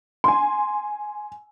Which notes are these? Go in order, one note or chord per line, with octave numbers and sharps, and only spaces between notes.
G#5 C6